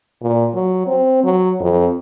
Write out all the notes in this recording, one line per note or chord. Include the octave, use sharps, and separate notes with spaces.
A#2
F#3
C4
F#3
F2